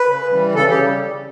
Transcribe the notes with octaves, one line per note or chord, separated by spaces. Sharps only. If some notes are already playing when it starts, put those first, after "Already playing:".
Already playing: B4
C#3
E3 G3
C#3 A4
G4
G3